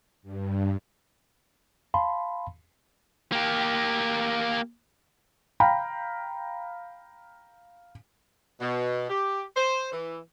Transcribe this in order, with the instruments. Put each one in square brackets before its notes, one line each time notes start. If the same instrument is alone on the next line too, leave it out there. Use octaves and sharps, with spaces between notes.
[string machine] G2
[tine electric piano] F5 A5 B5 C6
[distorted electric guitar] A#3 G4
[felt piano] F5 G5 A#5 B5
[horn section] B2
G4
C5
E3